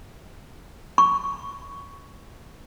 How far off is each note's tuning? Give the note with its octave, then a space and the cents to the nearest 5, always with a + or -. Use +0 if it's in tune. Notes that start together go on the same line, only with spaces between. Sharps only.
C#6 +10